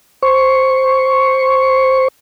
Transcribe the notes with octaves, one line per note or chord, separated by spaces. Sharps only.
C5 C#6